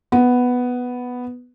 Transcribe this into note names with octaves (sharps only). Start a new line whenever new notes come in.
B3